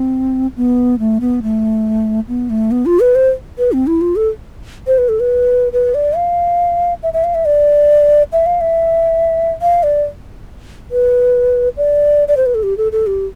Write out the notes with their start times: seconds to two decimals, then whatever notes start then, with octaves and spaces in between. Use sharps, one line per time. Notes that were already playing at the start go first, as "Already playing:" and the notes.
Already playing: C4
0.57 B3
0.99 A3
1.21 B3
1.43 A3
2.28 B3
2.50 A3
2.71 B3
2.86 F4
3.00 B4
3.15 C5
3.58 B4
3.72 C4
3.87 E4
4.01 F4
4.16 A4
4.87 C5
4.98 B4
5.09 A4
5.20 B4
5.73 B4
5.94 D5
6.16 F5
7.03 E5
7.14 E5
7.24 F5
7.35 E5
7.45 D5
8.33 E5
8.46 F5
8.61 E5
9.62 F5
9.83 D5
10.91 B4
11.77 D5
12.28 D5
12.37 C5
12.46 B4
12.55 A4
12.63 G4
12.78 A4
12.92 A4
13.07 G4